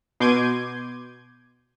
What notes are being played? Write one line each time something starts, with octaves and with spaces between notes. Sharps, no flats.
B2 C6 D6 G6 G#6 D#7